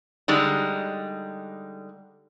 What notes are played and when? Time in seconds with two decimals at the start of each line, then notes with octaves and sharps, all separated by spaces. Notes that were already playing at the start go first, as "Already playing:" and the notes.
0.28 D3 G3 G#3 D#4